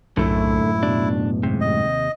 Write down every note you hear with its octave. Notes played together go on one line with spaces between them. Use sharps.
B1 F#2 A2 D3 A3 E4
B2 D4
D#2 G#2 C3
D#5